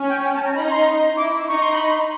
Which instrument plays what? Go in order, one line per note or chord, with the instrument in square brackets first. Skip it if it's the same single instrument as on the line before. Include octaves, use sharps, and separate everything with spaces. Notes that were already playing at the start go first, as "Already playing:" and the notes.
Already playing: [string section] C#4
[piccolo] G5
G5
A5
A#5
[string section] D#4 [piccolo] B5
[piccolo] C6
[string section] E4 [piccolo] D6
[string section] D#4 [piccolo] C#6
[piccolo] C6
B5
C6